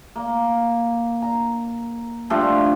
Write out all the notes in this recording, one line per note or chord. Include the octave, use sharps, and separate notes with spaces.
A#3
A#5
F3 G3 A3 D4